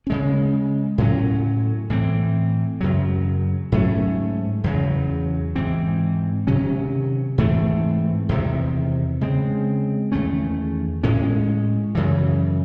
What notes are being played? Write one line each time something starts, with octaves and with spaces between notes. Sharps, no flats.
C#3 G#3 C#4
A2 F#3 C#4
A2 E3 C4
F#2 C#3 F#3
G#2 F#3 A3 C#4
E2 C#3 F#3
G#2 E3 C4
C3 D#3 F#3 C#4
G#2 E3 A3 C4
E2 C3 D#3
C#3 G#3 C4
E2 D#3 A3 C#4
A2 G#3 C#4
F#2 C#3 E3